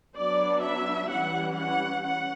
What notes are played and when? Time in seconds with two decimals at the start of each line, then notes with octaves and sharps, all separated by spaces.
0.16 F#3 B3 D4 D5
0.63 E5
1.10 E3 G3 C#4 F#5
1.58 F#5
2.05 C#4 F#5